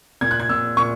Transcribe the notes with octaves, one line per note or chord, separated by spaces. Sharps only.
A#2 G#6
F#6
G#6
A#2 E6
A#2 C#6